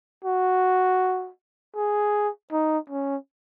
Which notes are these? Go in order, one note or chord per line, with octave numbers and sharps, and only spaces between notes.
F#4
G#4
D#4
C#4